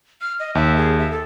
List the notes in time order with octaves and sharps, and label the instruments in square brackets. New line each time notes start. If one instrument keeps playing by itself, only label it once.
[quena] F6
D#5
[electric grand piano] D#2 [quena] E5
[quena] G#4
E5
A4